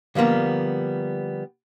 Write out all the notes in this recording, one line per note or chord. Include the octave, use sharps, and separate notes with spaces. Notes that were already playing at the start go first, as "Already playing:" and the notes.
D3 F3 G3 A#3 B3